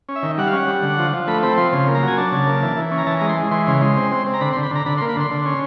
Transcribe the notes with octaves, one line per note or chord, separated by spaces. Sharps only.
C#4
E5
D#3
G3 F#5
F5
C#4 F#5
G3
D3
F3
F3
A3 B5
C4 B5
F3 C6
C#3 C6
A#3
A#5
F#3
G#5
D4 A5
C#3
A#3
E3
E3
C#4
A#5
E3 A5
A#5
G#3
C6
G#3
E3 C6
C#3 C6
G#3 C6
C4
C4
C4
A#5
D3 B5
C6
D3
B5
D3 A#5
D3 B5
C6
A#3
B5
D3 C6
D3
C#4